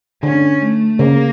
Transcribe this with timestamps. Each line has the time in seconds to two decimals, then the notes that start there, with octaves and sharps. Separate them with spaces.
0.23 D3 C#4
0.62 A3
0.99 C#3 A#3